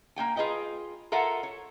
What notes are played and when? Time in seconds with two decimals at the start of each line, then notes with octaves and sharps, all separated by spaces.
0.16 A#3 C#4 G5 G#5
0.36 F4 G#4 B4 D#5 G5
1.12 F4 A4 A#4 E5 F#5 G#5
1.43 C#5